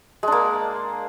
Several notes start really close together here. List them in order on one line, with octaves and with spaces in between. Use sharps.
G#3 D4 A#3